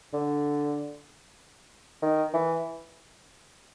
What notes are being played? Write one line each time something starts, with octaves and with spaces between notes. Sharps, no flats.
D3
D#3
E3